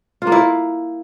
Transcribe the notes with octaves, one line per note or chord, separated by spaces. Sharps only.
F4
A#3
E4